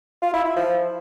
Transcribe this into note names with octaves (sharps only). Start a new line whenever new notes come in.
F4
E4
E4
F3